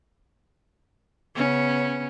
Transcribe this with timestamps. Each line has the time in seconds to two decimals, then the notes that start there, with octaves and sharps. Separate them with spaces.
1.35 C#3 B3 C#4